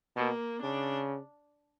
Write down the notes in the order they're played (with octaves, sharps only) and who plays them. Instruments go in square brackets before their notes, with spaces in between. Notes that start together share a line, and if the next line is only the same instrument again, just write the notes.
[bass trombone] B2 [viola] A#3
[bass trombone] C#3 [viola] D4